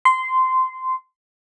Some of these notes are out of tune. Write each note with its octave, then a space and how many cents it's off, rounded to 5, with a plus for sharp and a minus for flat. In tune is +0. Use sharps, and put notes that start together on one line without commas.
C6 -15